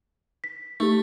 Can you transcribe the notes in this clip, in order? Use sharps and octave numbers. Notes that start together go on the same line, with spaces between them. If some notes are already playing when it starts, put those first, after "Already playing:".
B6
A3 D#4 G4